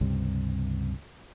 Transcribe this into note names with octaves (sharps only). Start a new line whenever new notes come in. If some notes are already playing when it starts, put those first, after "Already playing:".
C#2 G2 C3 G3